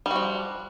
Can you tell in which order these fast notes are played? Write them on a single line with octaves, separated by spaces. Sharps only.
G3 F#4 F3